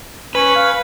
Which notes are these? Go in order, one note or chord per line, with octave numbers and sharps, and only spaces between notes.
C#4 B4
F5